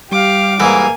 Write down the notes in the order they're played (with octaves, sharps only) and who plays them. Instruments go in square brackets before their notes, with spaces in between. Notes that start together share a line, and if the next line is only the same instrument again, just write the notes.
[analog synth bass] G3 [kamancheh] G4 F5 [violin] D6
[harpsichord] G#2 E3 [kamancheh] A#3 G#5